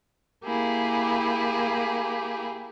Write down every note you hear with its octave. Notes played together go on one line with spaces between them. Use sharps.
A#3 E4 G4 G#4